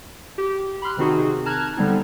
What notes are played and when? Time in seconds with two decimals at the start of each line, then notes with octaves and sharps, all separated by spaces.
0.38 G4
0.82 B5 C6 F6 F#6
0.97 C3 D#3 C4 D#4 F#4 G#4
1.46 A5 A#5 F6 F#6 G#6
1.77 D3 G3 B3 C4 D#4